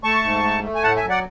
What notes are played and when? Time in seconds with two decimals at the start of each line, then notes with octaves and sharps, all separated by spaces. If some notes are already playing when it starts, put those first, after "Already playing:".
0.04 A3 A5 C#6
0.23 G#2
0.43 A3
0.63 A3
0.75 G#5
0.83 A2 F#5 A5
0.96 E5 G#5
1.04 F#3
1.10 D5 F#5